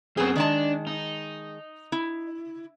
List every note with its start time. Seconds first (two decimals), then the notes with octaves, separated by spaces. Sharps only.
0.17 F#2 B3 C4 G#4
0.36 D#3 G#3 D4 A5
0.87 D#4
1.92 E4